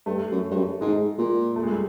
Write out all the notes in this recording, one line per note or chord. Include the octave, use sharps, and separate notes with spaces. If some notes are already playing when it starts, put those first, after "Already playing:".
G2 A3
F#2
G2
F#2
G#2 G#3
A#2
A3
G#3
G3